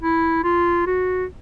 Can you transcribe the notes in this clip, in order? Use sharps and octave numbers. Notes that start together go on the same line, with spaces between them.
E4
F4
F#4